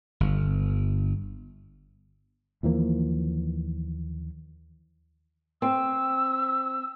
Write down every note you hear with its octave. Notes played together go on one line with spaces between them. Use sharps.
G1
D#2 E3 F3 A#3
C4 E6